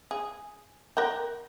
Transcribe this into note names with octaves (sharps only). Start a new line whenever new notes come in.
G#4
A#4 F#5 G5